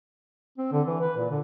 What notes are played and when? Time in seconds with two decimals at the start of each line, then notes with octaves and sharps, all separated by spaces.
0.58 C4
0.72 D3
0.87 E3
1.01 B4
1.16 A#2
1.30 D3